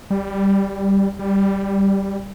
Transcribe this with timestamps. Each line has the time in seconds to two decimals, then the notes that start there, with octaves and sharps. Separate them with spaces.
0.11 G3
1.19 G3